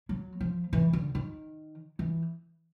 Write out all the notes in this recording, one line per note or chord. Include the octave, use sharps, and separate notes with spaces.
F#3
F3
E3
D3
D#3
E3